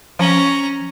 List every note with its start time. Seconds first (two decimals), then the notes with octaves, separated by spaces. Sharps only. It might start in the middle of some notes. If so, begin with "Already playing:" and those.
0.19 F3 C#4 A#5